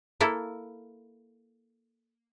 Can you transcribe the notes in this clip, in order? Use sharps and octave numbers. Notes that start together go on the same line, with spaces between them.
A#3 E4 A4